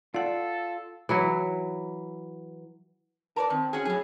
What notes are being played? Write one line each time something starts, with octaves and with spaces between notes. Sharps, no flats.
F4 A4 D5 F#5
E3 F#3 E4
A#4 B4 C#5 D5 A5
D#3 C4
C#4 F#4 G#4
A2 F#3 G#4